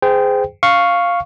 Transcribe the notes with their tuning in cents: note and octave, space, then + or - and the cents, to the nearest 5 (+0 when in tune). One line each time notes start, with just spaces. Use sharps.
G#4 +0 C5 -30 G5 +0
F5 +0 C#6 +0